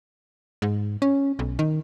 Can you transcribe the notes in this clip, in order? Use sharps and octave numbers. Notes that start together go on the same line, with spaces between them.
G#2
C#4
B1
D#3